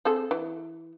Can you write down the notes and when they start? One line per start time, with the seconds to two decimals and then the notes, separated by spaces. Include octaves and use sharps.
0.05 C4 G#4 A4
0.31 E3